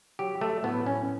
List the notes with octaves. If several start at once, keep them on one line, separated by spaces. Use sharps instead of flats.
F#3 G4
A3
A2 B3
C#4